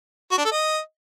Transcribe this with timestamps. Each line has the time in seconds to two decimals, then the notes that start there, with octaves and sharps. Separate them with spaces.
0.31 F#4
0.38 D4
0.45 A4
0.52 D#5